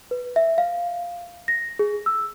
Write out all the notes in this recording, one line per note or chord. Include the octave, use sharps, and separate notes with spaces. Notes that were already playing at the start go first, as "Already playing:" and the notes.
B4
E5
F5
A#6
G#4
E6